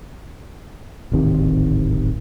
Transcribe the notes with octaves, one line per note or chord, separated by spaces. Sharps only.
D1 G#1 C3 D#3